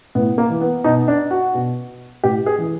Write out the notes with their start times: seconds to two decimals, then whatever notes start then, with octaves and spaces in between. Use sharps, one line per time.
0.15 A2 B3
0.38 A#3
0.50 E3
0.61 B3
0.84 B2 D#4
1.08 D4
1.31 F#4
1.54 B2
2.23 A2 G4
2.46 G#4
2.58 E3